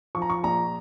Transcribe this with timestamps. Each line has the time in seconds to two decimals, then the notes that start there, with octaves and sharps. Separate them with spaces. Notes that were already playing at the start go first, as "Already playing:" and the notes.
0.15 F3 C#6
0.22 A#5
0.30 C#6
0.43 A#1 A#5